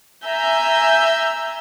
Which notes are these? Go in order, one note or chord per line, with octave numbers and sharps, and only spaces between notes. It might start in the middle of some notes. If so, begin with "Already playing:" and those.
E5 G#5 A#5 E6 G6